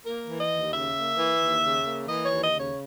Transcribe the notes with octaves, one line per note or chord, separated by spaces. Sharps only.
A#3 A#4
E3
D#5
D#2
C#3 E5
A#3
E3
D#2
C#3
A#3
E3 D#5
C#5
D#2
D#5
C#3
C#5